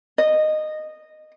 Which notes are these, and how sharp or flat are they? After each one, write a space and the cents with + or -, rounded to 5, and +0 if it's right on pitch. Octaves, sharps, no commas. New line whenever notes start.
D#5 -15